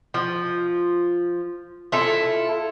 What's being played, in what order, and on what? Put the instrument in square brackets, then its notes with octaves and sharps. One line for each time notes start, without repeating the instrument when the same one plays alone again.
[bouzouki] F3
E4 F4 A4